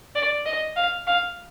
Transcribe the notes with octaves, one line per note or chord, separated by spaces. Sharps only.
D5
D#5
F5
F5